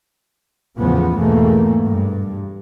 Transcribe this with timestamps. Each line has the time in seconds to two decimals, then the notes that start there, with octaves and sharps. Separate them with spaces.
0.78 E2 A2 C#3 F3 B3
1.17 E2 G#2 B2 A3 A#3
1.87 G2